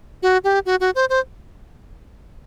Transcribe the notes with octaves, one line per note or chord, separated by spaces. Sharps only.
F#4
G4
F#4
F#4
C5
C5